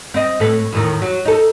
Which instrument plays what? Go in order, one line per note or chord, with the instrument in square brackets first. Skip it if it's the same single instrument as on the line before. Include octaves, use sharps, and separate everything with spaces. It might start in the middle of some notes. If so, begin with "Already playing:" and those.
[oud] C4 D#5
A2 A4 B4
E2 A2 D#3
F#3
D#4 A4